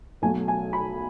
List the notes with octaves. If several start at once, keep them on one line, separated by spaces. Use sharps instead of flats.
B1 B2 F#3 A3 G#5
G#5
B5